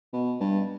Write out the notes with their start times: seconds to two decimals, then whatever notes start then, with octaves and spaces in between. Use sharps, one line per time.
0.13 B2
0.41 G2